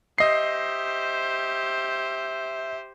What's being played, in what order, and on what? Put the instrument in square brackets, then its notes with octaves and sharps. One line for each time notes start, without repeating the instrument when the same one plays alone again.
[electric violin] G4 C5 [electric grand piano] D#5 C7 [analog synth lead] E5